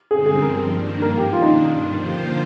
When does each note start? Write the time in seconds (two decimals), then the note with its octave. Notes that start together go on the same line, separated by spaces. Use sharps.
0.11 G2 D3 G#3 C4 G#4
0.26 G#4
0.42 G2 F3 C4 A#4
0.71 G2 D#3 A#3 D4
1.02 G#2 F3 A#3 A#4
1.17 G4
1.32 D#3 A#3 D4 F4
1.42 D#4
1.63 G2 D#3 G3 D4
1.93 D3 F3 A#3 F4 C5